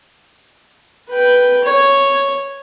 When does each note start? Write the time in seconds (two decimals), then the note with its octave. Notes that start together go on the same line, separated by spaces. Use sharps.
1.10 B4 G5
1.64 C#5